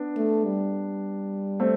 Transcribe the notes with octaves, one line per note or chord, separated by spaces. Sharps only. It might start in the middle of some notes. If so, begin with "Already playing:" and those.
Already playing: B3 D4
A3
G3
A3 C4